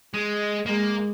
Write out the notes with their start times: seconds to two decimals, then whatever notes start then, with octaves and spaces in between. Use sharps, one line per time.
0.14 G#3
0.66 G#3 A#3